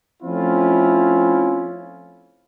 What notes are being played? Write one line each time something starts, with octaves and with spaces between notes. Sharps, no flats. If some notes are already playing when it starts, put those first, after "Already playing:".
F3 A3 C4 C#4 E4 F4